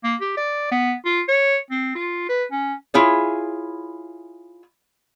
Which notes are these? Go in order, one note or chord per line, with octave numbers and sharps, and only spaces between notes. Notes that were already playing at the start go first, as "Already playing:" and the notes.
A#3
G4
D5
B3
F4
C#5
C4
F4
B4
C#4
E4 F4 G#4 C#5